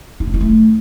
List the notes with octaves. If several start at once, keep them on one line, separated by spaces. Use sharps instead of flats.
E4
D4
E4
A3